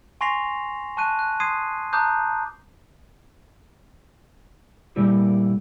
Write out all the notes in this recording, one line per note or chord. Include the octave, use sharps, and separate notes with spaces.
G#5 C6 C#6 A#6 C7 F7
A5 C#6 F#6 D#7
F#6
C6 D#6 G#6 C7 D#7
A5 A#5 D6 D#6 F#6 G6
A#2 G3 A3 A#3 E4 G4